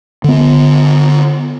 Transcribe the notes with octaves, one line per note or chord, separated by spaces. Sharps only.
D3 B3